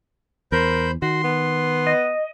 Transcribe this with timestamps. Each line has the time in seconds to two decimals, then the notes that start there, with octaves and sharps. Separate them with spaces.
0.52 E2 A#4 C5 B5 G6
1.02 D#3 F#4 C6
1.24 B3
1.87 D#5